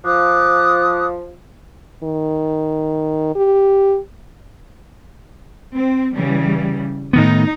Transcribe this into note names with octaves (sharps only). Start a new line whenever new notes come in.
F3 D6 D#6 F#6
D#3
G4
C4
C#3 E3 G3
A2 D#3 B3 D#4